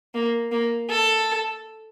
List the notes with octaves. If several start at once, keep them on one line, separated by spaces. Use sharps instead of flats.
A#3
A#3
A4